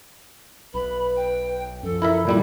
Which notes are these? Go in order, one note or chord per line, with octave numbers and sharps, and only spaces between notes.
B1 B4 B5
G5
F#2 F3 A4
E4 A#4 E5
A#2 F3 G3 E4